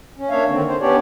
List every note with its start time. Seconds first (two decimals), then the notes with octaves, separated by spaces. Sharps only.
0.18 C#4
0.30 A#3 D4 C#5 E5 F5
0.48 D3 D#3 C4
0.67 C5
0.80 B3 C#4 D4 G4 C#5 D5